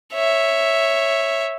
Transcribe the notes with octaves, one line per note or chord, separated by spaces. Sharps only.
C#5 E5